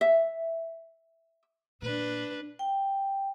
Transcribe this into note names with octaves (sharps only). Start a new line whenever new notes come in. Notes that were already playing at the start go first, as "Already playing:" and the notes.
E5
A#2 D4 B4
G5